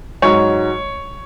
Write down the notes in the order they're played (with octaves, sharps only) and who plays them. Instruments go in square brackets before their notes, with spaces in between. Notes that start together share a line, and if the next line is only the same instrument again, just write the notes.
[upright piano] G#2 F#3 C#5